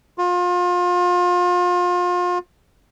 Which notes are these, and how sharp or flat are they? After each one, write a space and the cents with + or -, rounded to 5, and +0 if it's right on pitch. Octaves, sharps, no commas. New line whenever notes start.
F4 +30